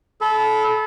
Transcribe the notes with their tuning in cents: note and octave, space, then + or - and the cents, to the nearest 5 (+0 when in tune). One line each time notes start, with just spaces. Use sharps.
A4 -30 B5 +0